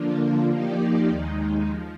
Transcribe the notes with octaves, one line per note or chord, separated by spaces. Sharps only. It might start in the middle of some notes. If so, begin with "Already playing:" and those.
Already playing: D3 F3 A#3 D4 F4
F3 A#3 D#4 G4 D5
D#2 D#3 G#3 D#4
F3